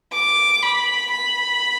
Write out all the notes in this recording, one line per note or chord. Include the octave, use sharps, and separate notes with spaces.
D6
B5
B5